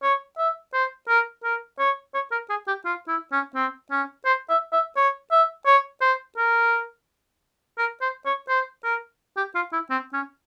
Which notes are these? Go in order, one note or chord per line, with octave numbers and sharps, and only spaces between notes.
C#5
E5
C5
A#4
A#4
C#5
C#5
A#4
G#4
G4
F4
E4
C#4
C4
C#4
C5
E5
E5
C#5
E5
C#5
C5
A#4
A#4
C5
C#5
C5
A#4
G4
F4
E4
C4
C#4